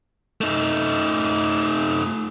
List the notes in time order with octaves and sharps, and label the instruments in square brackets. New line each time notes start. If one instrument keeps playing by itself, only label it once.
[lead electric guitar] A3 D#4